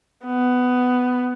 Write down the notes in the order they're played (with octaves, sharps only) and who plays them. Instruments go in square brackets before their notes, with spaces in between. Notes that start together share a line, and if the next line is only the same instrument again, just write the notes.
[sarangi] B3